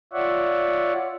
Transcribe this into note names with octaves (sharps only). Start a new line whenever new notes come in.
F4 C#5 D5 E5 F#5